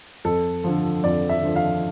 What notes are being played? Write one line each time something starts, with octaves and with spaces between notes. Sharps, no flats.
F2 A4
D3 F3
F2 D5
E5
D3 F3
F5